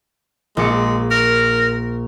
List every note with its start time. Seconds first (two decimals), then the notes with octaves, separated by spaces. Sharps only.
0.57 A#1 G#3 D6 C#7
1.11 A#4